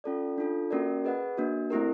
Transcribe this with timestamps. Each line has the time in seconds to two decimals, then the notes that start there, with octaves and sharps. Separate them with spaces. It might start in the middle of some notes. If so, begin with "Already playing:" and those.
0.04 C#4 F4 A4 D5
0.38 D4 F4 A4
0.71 A#3 C#4 F#4 A#4 D5
1.04 G#4 B4 D#5 F#5
1.37 A#3 D4 F#4
1.70 A3 C4 E4 G4 A#4